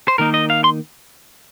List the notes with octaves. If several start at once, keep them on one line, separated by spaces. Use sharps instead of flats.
C5
D#3 A#3 D#4 A#4
D#5
F5
C6